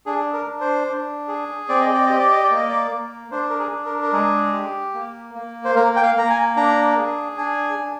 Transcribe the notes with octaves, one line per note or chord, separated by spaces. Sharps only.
D4 G#4
A#4
D4
C5
D4
G#4
C4 D5
D#5
D5
G4 D#5
D5
D#5
D5
A#3
D#5
D5
A#3
D4 C5
A#4
G#4
D4
A#4
A#4
G#3 G#4
G4
A#3
A#3
C5
A#3 A#4
G5
F5
A#3 A#5
G#5
D4 A#5
G#4
D4 G#5
D4